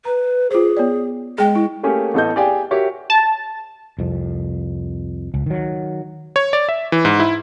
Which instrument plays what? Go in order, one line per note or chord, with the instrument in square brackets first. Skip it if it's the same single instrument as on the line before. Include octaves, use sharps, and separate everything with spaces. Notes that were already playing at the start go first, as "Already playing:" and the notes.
[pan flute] B4 [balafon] A#5
[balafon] F4 C5 [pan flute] G#4
[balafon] B3 C#5 D5
[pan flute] G#3 [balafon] G#4 G5
[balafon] E4
[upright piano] A3 A#3 C#4 G4 G#4
A1 B3 A4 D#5 G6
G4 G#4 D5 F5 G5 G#5
F#4 G4 A#4 C#5 E5
[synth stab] A5
[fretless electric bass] C2 F2
C#2
D#3 F#3
[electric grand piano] C#5
D5
E5
E3
G#2
E4